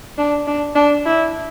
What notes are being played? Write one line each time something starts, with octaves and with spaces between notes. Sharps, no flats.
D4
D4
D4
E4